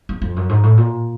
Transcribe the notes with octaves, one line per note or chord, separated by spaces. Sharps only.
E2
F2
F#2
G#2
A2
A#2